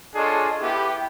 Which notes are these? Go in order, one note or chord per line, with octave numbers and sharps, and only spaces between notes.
D4 F4 G#4 A4 C#5 D#5
B3 E4 G4